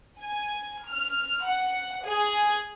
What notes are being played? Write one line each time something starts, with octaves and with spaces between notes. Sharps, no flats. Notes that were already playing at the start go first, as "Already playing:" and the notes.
G#5
F6
F#5
G#4